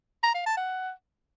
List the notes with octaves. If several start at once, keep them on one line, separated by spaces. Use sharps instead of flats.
A#5
F5
A5
F#5